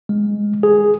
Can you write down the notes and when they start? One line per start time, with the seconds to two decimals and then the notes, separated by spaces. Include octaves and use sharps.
0.09 G#3
0.63 G#4